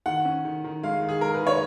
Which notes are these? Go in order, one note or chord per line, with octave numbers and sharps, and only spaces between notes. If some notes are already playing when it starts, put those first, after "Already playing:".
D#3 F#5
C#4
D#3
D#3
G#3 F5
D#3
G#4
G#3 A#4
B4
D#3
C#5